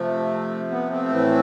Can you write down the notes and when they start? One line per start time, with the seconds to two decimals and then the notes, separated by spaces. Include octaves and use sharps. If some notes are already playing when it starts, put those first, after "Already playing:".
Already playing: C3 F3 A3
0.71 B3
0.90 A3 C4
1.10 A2 E3